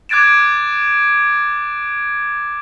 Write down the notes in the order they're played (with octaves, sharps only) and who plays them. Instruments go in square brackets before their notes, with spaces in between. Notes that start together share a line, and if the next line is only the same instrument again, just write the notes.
[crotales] D6 F#6 G#6 A6 D7 E7